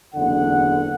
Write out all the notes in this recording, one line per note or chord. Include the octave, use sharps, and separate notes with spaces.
F#1 E2 D3 F#5